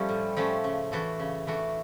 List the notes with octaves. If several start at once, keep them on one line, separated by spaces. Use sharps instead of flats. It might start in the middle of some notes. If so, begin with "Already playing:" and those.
Already playing: F3 G3 A3 C#4
A2
F3 A3 C#4
C#3
E3 A3 D4 F#4
C#3
E3 A3 D4 F#4